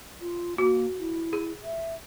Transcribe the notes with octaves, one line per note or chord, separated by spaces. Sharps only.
F4
A#3 F#4
E4
G#4
E5